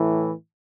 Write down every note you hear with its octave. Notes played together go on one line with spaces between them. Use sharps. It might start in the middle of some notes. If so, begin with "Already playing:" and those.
Already playing: A2 E3